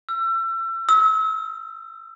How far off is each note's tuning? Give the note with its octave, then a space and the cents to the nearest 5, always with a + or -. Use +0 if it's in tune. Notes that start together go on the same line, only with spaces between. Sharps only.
E6 +35
E6 -35